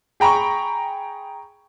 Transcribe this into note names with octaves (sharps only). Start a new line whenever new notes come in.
G#4 G5 A#5 B5 C#6